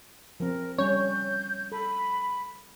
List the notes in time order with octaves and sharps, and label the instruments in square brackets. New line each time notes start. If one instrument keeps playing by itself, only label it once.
[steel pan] F3 C4 [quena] A#4
[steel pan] G3 C#4 [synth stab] C#5 [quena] G6
[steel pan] A4 [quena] B5